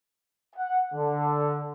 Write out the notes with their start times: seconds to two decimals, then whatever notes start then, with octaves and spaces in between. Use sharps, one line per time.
0.55 F#5
0.94 D3